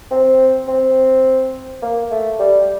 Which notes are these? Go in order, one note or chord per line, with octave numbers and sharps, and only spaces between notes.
C4
C4
A#3
A3
G3